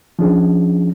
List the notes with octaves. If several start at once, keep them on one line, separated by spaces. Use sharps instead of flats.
F3 C#4 D4 G#4